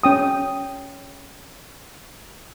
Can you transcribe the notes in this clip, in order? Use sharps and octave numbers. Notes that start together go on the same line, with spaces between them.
C#4 G5 D#6